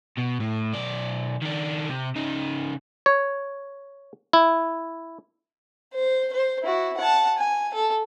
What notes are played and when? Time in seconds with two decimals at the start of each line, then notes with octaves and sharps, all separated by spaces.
0.18 B2
0.40 A2
0.73 B1 D5
1.42 D#3 D4
1.89 C3
2.16 C#3 D#4
3.06 C#5
4.33 E4
5.94 C5
6.33 C5
6.63 E4 F#4
6.97 F#5 A5
7.38 G#5
7.74 A4